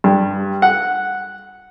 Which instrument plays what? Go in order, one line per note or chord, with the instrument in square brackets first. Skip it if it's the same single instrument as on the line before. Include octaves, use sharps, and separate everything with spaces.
[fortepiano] G2
F#5